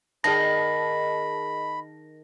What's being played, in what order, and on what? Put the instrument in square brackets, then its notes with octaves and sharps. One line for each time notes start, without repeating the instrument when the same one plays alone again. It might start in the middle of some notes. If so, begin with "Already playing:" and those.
[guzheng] D#3 [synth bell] G#4 D#5 A5 [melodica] B5 [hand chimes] A#6